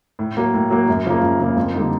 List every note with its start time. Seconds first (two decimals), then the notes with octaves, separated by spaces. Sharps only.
0.19 A2
0.37 F#3 A#3
0.54 A2
0.70 F#3 A#3
0.88 F#2
1.05 C#3 F3 A#3
1.23 F#2
1.40 C#3 F3 A#3
1.56 F2
1.74 D3 G3 A#3 D#4